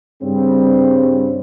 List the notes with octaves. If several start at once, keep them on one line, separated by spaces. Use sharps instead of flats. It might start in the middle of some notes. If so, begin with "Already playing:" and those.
G2 C#3 G3 C4